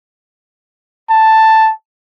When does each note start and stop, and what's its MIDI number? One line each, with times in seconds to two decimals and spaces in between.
1.10 1.71 81